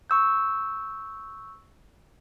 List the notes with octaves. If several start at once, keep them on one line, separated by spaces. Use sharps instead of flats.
C#6 E6 G6